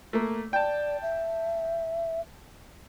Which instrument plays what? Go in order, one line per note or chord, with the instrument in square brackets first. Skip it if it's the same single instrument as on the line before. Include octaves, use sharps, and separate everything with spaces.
[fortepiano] A3 A#3
[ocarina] D5 [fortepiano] G5 A5
[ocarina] E5